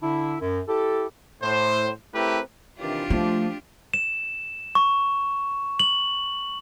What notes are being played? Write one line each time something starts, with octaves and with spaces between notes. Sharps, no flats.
D3 D4 E4
F#2
E4 G4 A4
A2 C5
A3 C4 E4 G4 A#4 B4
C3 D#3 E3 D4 F4 G4
F3 A3
E7
C#6
F#7